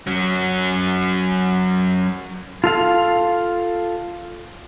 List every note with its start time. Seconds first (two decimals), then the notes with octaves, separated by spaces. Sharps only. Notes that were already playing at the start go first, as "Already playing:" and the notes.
0.07 F#3 C#4
2.64 F4 A4 F5